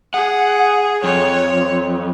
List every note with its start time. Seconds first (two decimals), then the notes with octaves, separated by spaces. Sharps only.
0.14 G#4 F#5
1.04 F2 C#5